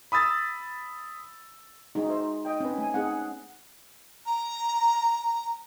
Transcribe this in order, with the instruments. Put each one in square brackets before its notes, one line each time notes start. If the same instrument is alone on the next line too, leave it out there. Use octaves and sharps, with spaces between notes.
[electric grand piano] B5 D#6 E6 A6
[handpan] G#3 D#4 [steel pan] F#4
[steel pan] C5 E5
D#5 G5
[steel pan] C4 B4 [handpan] C#4
[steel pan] A3 G#5
[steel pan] C4 D#4 G#4 [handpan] F#5
[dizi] A#5